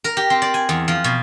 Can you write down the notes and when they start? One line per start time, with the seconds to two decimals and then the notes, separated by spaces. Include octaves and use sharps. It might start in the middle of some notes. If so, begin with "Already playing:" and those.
0.04 A#4
0.17 G4
0.30 C4
0.42 D5
0.54 G#5
0.69 E2
0.88 F3
1.04 B2